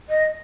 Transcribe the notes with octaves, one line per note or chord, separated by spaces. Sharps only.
D#5